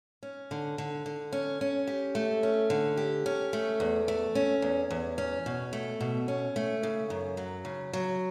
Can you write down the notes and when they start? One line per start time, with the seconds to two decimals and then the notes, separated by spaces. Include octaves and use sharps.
0.23 C#4
0.51 D3
0.78 D3
1.06 D3
1.33 C#4
1.61 C#4
1.87 G4
2.15 A3
2.43 C#4
2.70 D3
2.97 G4
3.26 C#4
3.53 A3
3.80 E2
4.08 A3
4.35 C#4
4.62 E2
4.90 E2
5.18 C#4
5.46 B2
5.73 A3
6.01 B2
6.28 C#4
6.56 A3
6.83 C#3
7.10 F#2
7.37 F#3
7.65 C#3
7.93 F#3